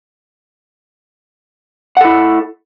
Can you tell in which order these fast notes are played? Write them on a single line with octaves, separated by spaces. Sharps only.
F#5 A4 E4